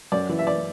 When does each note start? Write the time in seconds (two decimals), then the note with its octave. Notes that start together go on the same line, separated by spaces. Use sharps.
0.12 F#2 D5
0.29 E3
0.39 E5
0.47 E3 D5